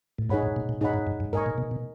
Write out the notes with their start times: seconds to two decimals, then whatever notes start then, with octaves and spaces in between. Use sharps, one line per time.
0.18 A2
0.29 G#2 D#4 G#4 C#5 F#5 B5
0.43 A2
0.56 A#2
0.69 A#2
0.81 A2 D#4 G#4 C#5 F#5 B5
0.94 G#2
1.07 G2
1.20 G2
1.33 G#2 A#4 D#5 G#5 C#6
1.46 A#2
1.58 B2
1.71 B2